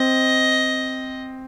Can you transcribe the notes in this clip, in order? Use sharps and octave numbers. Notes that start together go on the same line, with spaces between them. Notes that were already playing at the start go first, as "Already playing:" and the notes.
Already playing: C4 D#5